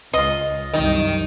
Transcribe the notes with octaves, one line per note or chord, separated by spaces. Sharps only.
C#2 F4 D#5
C2 F#2 D#3